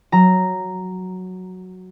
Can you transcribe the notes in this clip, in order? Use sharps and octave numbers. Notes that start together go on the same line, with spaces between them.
F#3 A#5